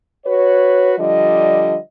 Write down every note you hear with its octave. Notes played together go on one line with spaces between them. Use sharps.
F#4 B4 C#5
D3 F3 G3 D#5